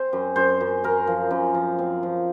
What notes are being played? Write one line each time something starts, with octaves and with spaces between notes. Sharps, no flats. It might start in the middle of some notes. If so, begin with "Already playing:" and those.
Already playing: C4 C5
F#2
F#2 C5
F#2
F#2 A#4
F3
F#2
F3
C4
F3